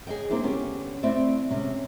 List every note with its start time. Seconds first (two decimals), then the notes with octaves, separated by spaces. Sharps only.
0.07 G#4 C#5 D#5 G5
0.30 A#3 C4 D4 E4 G#4
0.43 D3 B3 C#4 G4
1.03 A3 C4 E4 C5 D5 E5
1.51 C3 G#3 C#4